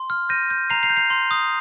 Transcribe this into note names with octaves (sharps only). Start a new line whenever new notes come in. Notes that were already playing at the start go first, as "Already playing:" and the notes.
Already playing: C6
F6
G6 A#6 D#7
G6
A#5 C7 F7
C7 F7
G6
C7 F7
C6
D#6